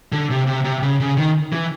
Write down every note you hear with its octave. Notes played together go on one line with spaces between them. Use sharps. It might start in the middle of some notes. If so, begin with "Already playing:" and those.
D3
C3
C3
C3
C#3
C#3
D#3
E3